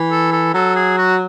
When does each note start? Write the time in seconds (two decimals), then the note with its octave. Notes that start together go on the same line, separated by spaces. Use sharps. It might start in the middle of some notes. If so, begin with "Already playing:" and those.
Already playing: E3
0.11 A4
0.32 A4
0.54 F#3 A4
0.76 G#4
0.98 F#4